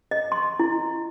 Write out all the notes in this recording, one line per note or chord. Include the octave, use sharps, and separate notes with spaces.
D#5
C6
E4